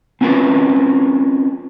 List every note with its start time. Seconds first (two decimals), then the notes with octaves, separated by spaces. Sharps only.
0.21 C4 C#4 F4 A#4 B4